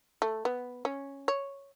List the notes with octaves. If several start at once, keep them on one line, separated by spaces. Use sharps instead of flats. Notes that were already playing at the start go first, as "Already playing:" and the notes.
A3
B3
C#4
C#5